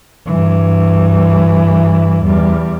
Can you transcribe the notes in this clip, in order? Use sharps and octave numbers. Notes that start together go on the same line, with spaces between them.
G2 E3
E2 G3